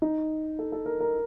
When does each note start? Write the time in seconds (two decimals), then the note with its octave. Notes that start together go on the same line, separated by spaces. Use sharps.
0.02 D#4
0.59 A4
0.72 A4
0.86 A#4
1.01 A#4